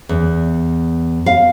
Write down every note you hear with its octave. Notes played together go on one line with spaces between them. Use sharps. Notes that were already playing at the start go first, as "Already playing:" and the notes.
E2
F5